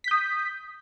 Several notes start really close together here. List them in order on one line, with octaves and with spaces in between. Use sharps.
B6 G6 D#6